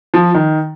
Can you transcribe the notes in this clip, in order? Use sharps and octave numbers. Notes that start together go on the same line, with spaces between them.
F3
D#3